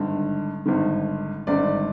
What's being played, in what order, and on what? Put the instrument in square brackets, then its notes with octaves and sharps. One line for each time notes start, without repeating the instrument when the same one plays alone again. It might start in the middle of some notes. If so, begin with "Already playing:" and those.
Already playing: [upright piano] G#1 G2 D3
G#1 G2 D3
G#1 G2 D3 D5